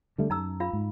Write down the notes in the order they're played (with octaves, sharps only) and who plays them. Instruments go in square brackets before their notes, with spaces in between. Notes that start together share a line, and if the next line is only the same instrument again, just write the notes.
[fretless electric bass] D3 G3 A3
[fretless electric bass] F#2 [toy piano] D#4 A#5 E6
[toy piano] F4 F5 B5
[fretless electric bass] G#2